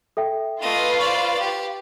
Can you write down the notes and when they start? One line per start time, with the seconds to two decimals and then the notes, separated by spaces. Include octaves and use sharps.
0.17 A4 E5 G5
0.61 A3 F4 B4 D#5 F5
0.99 C5 D5 C#6
1.40 G4